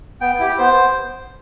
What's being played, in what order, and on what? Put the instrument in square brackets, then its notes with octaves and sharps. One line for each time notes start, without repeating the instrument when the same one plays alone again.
[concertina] B3 G5
E4 G4
B3 C5